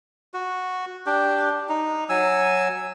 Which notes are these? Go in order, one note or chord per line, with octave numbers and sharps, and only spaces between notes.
F#4
D4 G4
D#4
F#3 G#5 E6